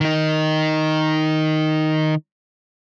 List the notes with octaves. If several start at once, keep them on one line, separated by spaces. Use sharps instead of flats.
D#3 D#4